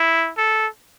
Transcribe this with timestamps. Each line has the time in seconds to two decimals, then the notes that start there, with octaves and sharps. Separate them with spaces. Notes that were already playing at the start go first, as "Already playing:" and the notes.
Already playing: E4
0.38 A4